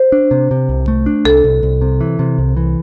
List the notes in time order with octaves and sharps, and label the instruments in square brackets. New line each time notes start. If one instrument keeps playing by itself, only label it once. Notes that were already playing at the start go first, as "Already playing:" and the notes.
Already playing: [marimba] C5
[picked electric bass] D4
C3
C3
C2
A3
D4
[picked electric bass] C2 [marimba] A4
[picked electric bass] C2
C2
C3
E3
C3
C2
E3